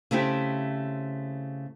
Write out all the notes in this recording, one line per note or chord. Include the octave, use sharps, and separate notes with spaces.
C#3 A3 C4 E4 G4